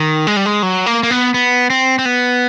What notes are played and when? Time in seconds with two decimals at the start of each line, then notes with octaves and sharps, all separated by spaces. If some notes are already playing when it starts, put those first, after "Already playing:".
Already playing: D#3
0.27 G#3
0.37 G3
0.46 G#3
0.63 F#3
0.86 A#3
1.03 A#3
1.11 B3
1.34 B3
1.70 C4
1.99 C4
2.05 B3